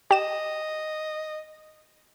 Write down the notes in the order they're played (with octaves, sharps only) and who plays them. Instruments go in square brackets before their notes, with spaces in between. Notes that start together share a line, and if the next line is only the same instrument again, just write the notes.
[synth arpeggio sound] G4 E7 [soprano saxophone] D#5